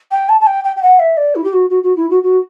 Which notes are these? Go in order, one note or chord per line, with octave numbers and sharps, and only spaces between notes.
G5
A5
A5
G5
G5
G5
F#5
E5
D5
E4
G4
F#4
F#4
F#4
E4
F#4
F#4